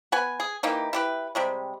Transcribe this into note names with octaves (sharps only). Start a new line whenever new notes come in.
B3 B4 G#5
G#4
E3 A#3 D#4 G4
E4 G4 B4
C3 G3 G#3